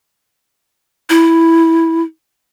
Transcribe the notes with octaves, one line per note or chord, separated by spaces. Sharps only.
E4